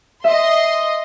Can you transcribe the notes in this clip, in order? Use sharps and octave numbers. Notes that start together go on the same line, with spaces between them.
D#5 E5 C6